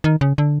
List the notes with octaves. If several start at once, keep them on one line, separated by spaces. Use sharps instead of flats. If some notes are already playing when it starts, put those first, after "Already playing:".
D#3
C#3
D3